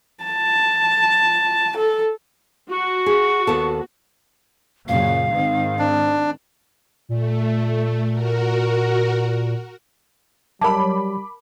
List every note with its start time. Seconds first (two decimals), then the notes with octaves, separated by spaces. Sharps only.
0.24 A5
1.77 A4
2.71 F#4 C#6
3.06 G#4
3.47 D#2 B3 A4
4.88 F#2 A#2 C#3 F5
5.32 G#2 D#3 C4
5.79 D4
7.09 A#2 A3
8.10 F#4 A#4
10.61 F#3 G3 A#4 A5 B5 D6